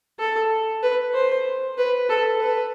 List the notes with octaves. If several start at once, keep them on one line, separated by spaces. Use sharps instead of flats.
A4
B4
C5
B4
A4
B4